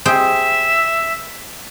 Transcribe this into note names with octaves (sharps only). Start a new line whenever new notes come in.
G#4 C5 E5 G5